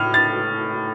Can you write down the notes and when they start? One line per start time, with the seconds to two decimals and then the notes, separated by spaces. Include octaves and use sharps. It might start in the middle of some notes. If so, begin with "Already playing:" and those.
Already playing: A2 F6
0.14 A6